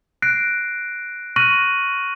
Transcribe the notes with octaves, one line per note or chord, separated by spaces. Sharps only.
F#6 A#6 C7 D7
C#6 F6 F#6 A#6 D#7 F#7